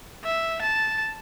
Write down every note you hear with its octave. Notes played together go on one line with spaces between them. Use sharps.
E5
A5